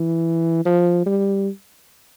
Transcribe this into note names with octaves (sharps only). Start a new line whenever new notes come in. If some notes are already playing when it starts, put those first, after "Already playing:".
Already playing: E3
F3
G3